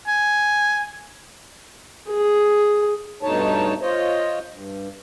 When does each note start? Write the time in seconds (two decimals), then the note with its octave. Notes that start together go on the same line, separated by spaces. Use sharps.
0.07 G#5
2.10 G#4
3.23 G2 B2 A3 D#4 C#5 A5
3.81 F4 C5 C#5 D#5
4.49 G2